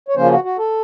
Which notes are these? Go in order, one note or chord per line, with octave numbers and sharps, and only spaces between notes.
C#5
C#3 F3 A#3 C#4 C5
F4
F#4
F#4
A4